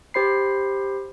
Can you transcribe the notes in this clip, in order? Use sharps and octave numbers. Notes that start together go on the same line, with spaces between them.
G4 C5 B5 C7